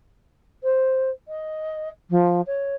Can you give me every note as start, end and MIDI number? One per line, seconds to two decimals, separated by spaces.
0.63 1.10 72
1.28 1.89 75
2.10 2.41 53
2.46 2.75 73